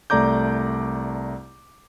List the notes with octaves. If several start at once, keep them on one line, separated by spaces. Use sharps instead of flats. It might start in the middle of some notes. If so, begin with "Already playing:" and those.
C2 A3 D5 A#5 D6 G6